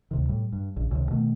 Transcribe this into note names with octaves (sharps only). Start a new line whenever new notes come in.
D2 C3 D#3
A2 G3
G2
A#1 C#3
C#2 C3 D#3
B2 D#3 A3